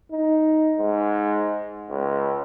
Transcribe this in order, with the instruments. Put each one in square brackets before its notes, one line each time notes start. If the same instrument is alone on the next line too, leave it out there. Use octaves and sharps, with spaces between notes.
[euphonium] D#4
G#2
C#2